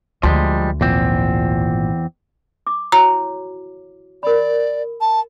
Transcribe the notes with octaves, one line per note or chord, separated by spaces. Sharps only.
D2 F3 G3 G#3
G#1 E2 A#2 F3 C4
D6
E4 F#4 C#5 A#5
A#4 D5 B5
A5